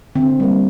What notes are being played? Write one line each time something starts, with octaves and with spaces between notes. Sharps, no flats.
D3 C4
G3 A#3